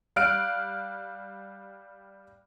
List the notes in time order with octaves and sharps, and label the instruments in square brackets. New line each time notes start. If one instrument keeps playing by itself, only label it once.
[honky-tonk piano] G3 F5 F6 F#6 D7